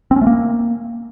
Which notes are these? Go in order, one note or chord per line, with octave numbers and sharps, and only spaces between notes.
C4
C#4
A3
A#3